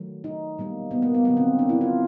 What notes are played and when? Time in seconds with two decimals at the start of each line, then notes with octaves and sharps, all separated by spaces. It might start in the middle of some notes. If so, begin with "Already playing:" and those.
Already playing: D#3 F#3 A3
0.24 D#4
0.58 B2 G3 A#3
0.91 B3
1.02 A#3
1.14 B3
1.25 D3 F#3 A#3 B3
1.37 C4
1.59 D4
1.69 E4
1.81 F4